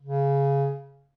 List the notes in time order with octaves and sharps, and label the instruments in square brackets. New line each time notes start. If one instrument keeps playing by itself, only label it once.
[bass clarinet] C#3